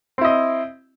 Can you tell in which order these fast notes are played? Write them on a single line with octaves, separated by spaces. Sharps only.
C4 E4 D#5